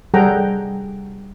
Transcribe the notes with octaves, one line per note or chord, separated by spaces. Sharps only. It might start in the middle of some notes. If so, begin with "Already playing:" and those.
G3 G#4 A4 F#5 G5 A#5